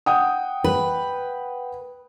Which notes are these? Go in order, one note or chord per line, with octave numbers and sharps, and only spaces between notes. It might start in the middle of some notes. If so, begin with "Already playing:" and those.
F#5 G5 D#6
B4